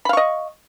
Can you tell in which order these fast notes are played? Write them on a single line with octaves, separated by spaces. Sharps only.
B5 F5 C#6 D#5